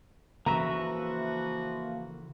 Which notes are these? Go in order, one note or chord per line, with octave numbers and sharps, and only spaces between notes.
C#3 E3 F3 A#3 F#4 B4 E5 A#5